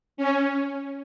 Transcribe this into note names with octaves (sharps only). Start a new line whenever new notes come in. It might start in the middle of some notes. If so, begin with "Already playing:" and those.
C#4